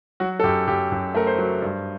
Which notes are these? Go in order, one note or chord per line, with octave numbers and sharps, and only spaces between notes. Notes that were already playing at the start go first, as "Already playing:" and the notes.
F#3 F#4
A4
F#2 G4
F#2 G4
F#2
A3 A#4
C5
F#3
G2